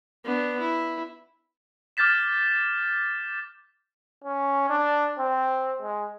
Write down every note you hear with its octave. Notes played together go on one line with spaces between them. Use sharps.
B3 D4
E4
D6 F6 G6 A6 B6 E7
C#4
D4
C4
G#3